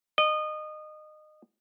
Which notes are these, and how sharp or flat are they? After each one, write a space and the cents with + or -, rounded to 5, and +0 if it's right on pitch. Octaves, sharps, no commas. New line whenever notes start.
D#5 -25